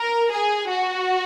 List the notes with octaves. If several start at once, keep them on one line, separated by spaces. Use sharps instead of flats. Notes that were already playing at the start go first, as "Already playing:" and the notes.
Already playing: A#4
G#4
F#4